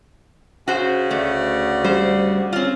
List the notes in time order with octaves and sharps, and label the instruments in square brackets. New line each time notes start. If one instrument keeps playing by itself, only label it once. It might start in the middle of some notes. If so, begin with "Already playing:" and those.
[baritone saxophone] C#3 [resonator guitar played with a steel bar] F#4 C5
[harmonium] D2 D5 F#5 [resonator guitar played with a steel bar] A3
[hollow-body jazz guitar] G3 [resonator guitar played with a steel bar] C5
[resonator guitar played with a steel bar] C4 F4 [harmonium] C#4